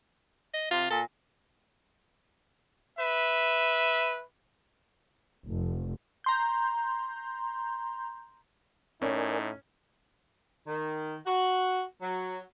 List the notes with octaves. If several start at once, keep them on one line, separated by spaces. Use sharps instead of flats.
D#5
C3 F4
A#2 A4
B4 E5
F1
A#5 C6 G6
A2 C#4 D#4 A#4 D5 G#5
D#3
F#4
F#3